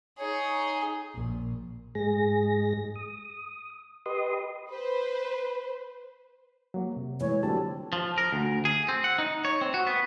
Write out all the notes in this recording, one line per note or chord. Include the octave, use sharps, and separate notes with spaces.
D#4 G#4 C#5
A#1
G#2 G#3 G#4 A#6
D#6
G4 B4 D#5 C6 D#6
B4 C5
F#3 A#3
C3
E3 G#3 C#5
D3 F#3 C4 G4 A5
F3
A#4
D2
G#4
C4
F#5
D#4
C#5
C4
F#4
B3